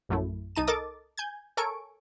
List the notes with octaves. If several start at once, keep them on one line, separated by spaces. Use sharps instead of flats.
A#1 F#2 A3 E4
C2 D#4 A5 D#7
A4 A#4 D#5 D6 A6
G#5 G6 G#6
A4 A#4 C#5 G#5 C#6 D7